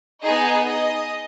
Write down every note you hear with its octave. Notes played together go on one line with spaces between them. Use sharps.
B3 D#4 G#4 D#5
D#5